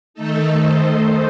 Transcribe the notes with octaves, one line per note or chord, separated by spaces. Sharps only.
D#3 A3 D#4 A4
C5